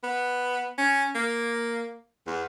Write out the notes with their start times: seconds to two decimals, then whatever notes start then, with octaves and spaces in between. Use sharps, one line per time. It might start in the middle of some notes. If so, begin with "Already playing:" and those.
0.03 B3
0.78 C#4
1.15 A#3
2.27 E2